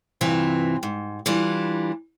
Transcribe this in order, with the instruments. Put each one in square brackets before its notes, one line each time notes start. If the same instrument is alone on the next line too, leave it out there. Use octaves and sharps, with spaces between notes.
[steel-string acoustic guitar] G2 C3 E3 C4 F4
G#2
E3 G3 D4 F4